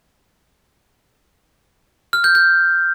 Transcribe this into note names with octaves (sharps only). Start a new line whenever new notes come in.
F6
G6
G6